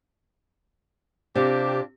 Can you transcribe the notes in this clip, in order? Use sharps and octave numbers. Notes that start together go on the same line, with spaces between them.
C3 D4 F4 G4